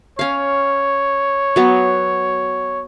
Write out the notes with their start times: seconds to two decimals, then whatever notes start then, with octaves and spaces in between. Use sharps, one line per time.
0.19 C#4 C#5 F5
1.56 F#3 B3